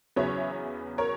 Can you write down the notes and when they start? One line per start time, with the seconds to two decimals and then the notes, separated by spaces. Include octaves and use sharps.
0.16 E2 C#3 F#3 B3 C#5 E5
0.98 A#4 C#5